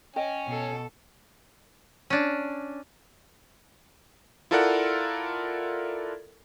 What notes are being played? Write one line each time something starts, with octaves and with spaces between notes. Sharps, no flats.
C#4 C#5 D#5 G5 G#5
B2 A4
C#4 D4
E4 F4 A4 A#4 D5 F#5